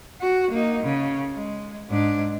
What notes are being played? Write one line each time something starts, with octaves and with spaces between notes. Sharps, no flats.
F#4
A#3 D#4
C#3
G#3
G#2 D4